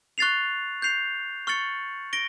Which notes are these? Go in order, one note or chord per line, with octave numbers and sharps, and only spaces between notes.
C#6 F#6 A6 C7 F7
G6 C7 F7
C#6 F6 A6 C#7 F#7
A#6 D7 G7